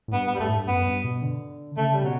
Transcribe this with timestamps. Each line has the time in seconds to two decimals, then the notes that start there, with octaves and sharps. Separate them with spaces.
0.08 A2
0.13 G2 B3
0.27 B3
0.34 G3
0.40 G2 A3
0.48 A2
0.56 G2
0.67 F#2 B3
0.86 G2
1.04 B2
1.22 D3
1.77 C#3 A3
1.93 G3
2.00 C#3
2.04 B2 F#3